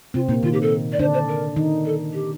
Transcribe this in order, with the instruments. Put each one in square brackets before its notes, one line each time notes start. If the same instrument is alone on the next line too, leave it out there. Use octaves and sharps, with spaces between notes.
[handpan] C3 C4 [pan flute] F4
[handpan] A#2 A#3 [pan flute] D#4
[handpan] D#3 [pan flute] F4
[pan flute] G4
A4
D5
[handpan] D3 D4 [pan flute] C5
[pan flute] C5
A#4
[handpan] D#3 D#4
[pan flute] A4
G4